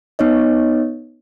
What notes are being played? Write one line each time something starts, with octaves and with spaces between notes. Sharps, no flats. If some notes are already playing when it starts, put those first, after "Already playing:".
B3 D#4 C#5 D#5